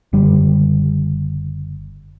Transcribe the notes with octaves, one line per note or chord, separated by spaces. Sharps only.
F#1 D3 G3